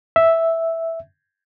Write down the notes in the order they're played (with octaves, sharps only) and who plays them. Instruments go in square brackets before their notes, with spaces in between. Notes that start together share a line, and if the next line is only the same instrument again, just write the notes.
[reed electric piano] E5